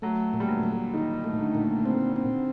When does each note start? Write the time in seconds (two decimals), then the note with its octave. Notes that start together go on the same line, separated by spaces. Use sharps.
0.02 F#3 A3
0.33 A#2
0.40 G3
0.48 F#3
0.63 A#2
0.94 D#3 D#4
1.24 A3
1.39 D3
1.55 A#2
1.86 C4
2.16 C4